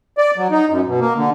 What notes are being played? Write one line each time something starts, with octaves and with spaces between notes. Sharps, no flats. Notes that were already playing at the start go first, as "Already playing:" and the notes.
D5
F#3
D#4
F#2
B2
A#3
D3